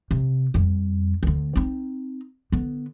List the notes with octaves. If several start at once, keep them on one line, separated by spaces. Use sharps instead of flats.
C3
F2 G3
D2 D3
C4 D#4
D3 B3